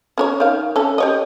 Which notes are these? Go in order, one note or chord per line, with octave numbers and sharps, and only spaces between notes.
C#4 A#4 C#5
D#3 F5
C#4 A4
G4 C#5 D#5